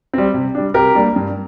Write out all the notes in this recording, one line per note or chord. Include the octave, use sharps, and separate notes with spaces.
G3 C4
C3
G3 D4
C3 G4 A#4
G3 A#3 D4
G2